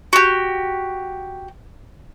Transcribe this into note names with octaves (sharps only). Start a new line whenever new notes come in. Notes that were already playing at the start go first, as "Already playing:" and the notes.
F#4 G4